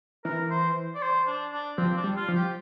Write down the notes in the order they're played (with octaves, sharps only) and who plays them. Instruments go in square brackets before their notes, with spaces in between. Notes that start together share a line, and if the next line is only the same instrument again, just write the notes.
[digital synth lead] E3 [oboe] A#4
[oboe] C5
D5
C5
D4
D4
[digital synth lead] F3 [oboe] C4
[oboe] D4
[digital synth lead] G3
[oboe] F4
[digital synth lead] F3
[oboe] G4